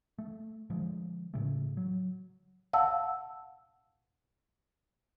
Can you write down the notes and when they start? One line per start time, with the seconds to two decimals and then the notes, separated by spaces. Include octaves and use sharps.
0.18 A3
0.70 D3 F3 G#3
1.34 A2 C#3 A3
1.77 F#3
2.73 F5 F#5 A5 E6